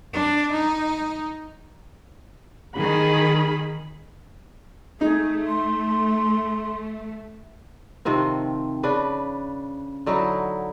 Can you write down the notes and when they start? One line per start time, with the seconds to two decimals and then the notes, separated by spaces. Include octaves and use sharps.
0.13 D4
0.52 D#4
2.76 D#3 G#4 B5
5.01 A3 D#4 G#4
5.47 C6
8.05 C3 D#3 F3 C4
8.83 C#3 D4 B4
10.06 D3 F#3 D#4 E4